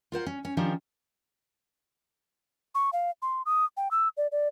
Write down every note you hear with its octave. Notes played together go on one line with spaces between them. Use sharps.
F4 A#4 C5 F#5
C#4
C#4
D#3 F3 C#4 D4 G4 C5
C#6
F5
C6
D#6
G5
E6
D5
D5